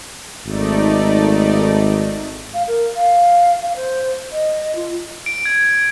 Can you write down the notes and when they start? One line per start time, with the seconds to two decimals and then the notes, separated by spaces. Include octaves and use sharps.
0.46 G#1 A3 D#4 D5
2.54 F5
2.67 A#4
2.96 F5
3.63 F5
3.76 C5
4.32 D#5
4.76 F4
5.26 D7
5.45 G#6